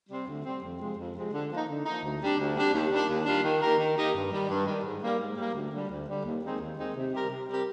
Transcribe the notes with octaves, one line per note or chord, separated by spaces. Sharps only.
C3 G3 C4
D2
C3 G3 C4
F2
C3 F3 G#3 C4
F2
C3 F3 G#3 C4
D3
F3 A#3 D#4
D3
F3 A#3 D#4
D2
C3 G3 D4 G4
D2
C3 G3 D4 G4
D#2
D#3 G3 D4 F4
D#2
D#3 G3 D4 F4
D#3
A#3 D#4 G4 A#4
D#3
A#3 D#4 G4 A#4
G2
D#3 G3
G2
D#3 G3
G#2
G3 A#3
G#2
G3 A#3
D2
D3 G3
D2
D3 G3
D#2
D#3 G#3 C4 D#4
D#2
D#3 G#3 C4 D#4
C3
G3 C4 G4 A#4
C3
G3 C4 G4 A#4